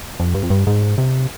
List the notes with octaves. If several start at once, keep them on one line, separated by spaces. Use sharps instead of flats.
F2
G2
F2
G2
G#2
C3